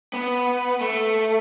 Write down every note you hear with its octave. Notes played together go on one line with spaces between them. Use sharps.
B3
A3